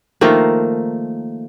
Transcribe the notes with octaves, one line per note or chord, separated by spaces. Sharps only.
D#3 F3 A3 A#3